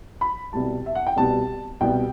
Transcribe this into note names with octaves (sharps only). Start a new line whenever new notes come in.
B5
C2 B2 G3 A5
E5
F#5
G5
C2 B2 G3 A5
C2 B2 G3 G5